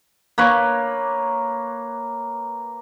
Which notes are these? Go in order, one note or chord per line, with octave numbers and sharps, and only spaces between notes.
A#3 B4 C#5